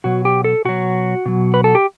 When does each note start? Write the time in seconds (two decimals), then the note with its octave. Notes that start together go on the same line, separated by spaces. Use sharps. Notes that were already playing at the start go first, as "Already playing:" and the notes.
0.04 B2 F#3 F#4
0.25 G4
0.44 A4
0.65 B2 F#3 F#4
1.26 B2 F#3
1.54 B4
1.64 A4
1.75 G4